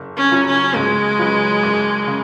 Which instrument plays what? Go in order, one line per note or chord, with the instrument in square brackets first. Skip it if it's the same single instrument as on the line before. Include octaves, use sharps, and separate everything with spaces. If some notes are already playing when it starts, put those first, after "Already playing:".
Already playing: [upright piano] F#1
[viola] C#4
[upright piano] F#2 C#3 F#3
[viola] C#4
[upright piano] C#2 [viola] G#3
[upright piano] C#3 F#3 C#4 B4
F#1
C#3